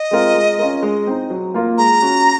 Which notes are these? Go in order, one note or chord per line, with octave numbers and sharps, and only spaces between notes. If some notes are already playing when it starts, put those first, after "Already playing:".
Already playing: D#5
G#3 C4 F4 A#4
G#3
C#4 F4 A#4
G#3
C4 D#4
F#3
A#3 F4 A#4
G#3 A#5
C#4 F#4